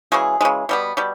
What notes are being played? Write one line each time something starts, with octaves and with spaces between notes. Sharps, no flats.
C#3 E3 G#3 F#4 G#4
C#3 E3 G#3
B2 G3 B3
B2 G3